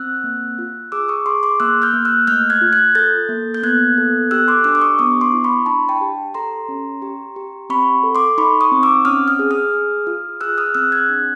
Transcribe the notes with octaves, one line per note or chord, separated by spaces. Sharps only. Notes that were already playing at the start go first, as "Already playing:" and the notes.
Already playing: C4 E6 F#6
A#3
F4
G#4 D6 E6
C#6 D#6
G#4 C6 D6
C6 D6
A#3 E6 F#6
F6 G6
A#3
E6 F#6
A3 F6 G6
F#6 G#6
F4
F#6 G#6
A4 G6 A6
A#3
G6
B3 F#6 G#6
A4
G4 E6 F#6
C6 D6
D4 D6 E6
D6
C#6 D#6
B3 C#6 D#6
C6 D6
E4
B5 C#6
D4 A5 B5
G5 A5
G4
A4 A#5 C6
C#4
G4
G4
C4 B5 C#6
A4
C6 D6
D#4 B5 C#6
C#6 D#6
C4
D6 E6
C#4 D#6 F6
D#6 F6
G#4
D#6 F6
G#4
F4
G#4 E6 F#6
D#6 F6
C4 E6 F#6
F#6 G#6
D4